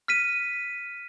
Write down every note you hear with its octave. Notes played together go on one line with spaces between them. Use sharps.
F6 B6 D#7